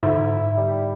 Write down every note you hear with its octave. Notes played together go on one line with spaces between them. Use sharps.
G#2 D3 E4
G3